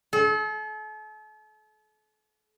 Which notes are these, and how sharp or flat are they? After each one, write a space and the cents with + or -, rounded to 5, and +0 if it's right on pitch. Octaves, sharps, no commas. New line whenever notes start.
A4 -40